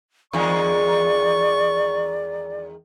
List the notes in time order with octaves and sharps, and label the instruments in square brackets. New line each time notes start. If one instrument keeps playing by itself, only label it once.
[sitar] E2 D#3 G#3 [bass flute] D5 [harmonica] C#6